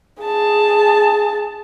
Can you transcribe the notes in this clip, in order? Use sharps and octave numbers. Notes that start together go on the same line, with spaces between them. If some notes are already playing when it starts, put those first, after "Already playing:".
G#4 A5